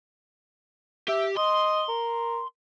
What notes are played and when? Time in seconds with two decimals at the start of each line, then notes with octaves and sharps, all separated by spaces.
1.08 G4 E5
1.37 D#5 C6
1.89 A#4